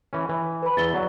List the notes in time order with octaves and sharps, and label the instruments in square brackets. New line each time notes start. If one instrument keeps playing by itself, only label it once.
[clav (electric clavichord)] E3 C#4
E3
[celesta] B4 B5
[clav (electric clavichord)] E2 E5 [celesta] A6 G7
[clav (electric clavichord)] F#3 [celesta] D5 F#5